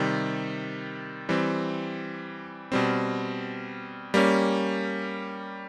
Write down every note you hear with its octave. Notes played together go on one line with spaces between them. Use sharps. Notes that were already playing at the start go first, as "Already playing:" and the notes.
Already playing: C3 D#3 G3
E3 G3 C4
B2 G3 C4
G3 A#3 C#4